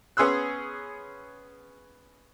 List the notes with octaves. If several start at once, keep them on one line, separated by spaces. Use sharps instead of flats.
B3 C#4 G#4 C6 E6 F#6